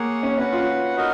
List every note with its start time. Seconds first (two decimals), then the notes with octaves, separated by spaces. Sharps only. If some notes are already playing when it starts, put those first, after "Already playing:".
Already playing: A#3 G#4 C#5 F#5
0.23 C#4
0.38 C#4 F#4 B4 F#5
0.52 F4
0.96 D#4 F#4 A#4 D#5